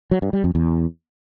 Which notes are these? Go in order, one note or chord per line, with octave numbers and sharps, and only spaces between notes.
F#3
G2
G3
F2
E2